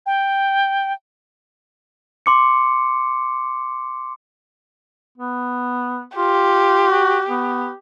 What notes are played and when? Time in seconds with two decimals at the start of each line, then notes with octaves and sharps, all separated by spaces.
0.06 G5
2.26 C6 D6 C#7
5.18 B3
6.17 F4 G4
6.90 F#4
7.29 B3